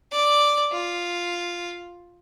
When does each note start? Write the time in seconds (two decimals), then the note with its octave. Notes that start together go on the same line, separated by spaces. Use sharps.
0.12 D5
0.72 F4